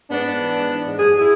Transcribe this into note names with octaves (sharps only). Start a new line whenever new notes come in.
G#2 B3 D4
G#2
E3
G#2
E3
G#2
F#2 G#4
E4 G#4